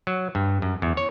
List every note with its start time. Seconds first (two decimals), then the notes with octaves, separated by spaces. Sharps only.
0.07 F#3
0.35 G2
0.62 F#2
0.82 E2
0.97 C#5